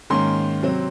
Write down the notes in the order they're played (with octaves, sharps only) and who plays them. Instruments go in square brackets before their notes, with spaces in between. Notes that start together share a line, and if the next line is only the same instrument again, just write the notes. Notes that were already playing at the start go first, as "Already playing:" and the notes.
[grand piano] G#2 D#3 A#3 C#4 C6
C3 F#3 C4